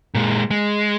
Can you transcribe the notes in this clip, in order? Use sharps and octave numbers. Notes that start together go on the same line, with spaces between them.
A#2 G#3
G#3